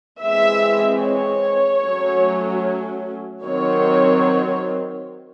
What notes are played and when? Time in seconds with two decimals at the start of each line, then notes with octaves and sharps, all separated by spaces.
0.22 E3 G#3 C4 E5
1.03 C#5
1.84 F#3 A3 C#4
3.44 D#3 F#3 C4 C#5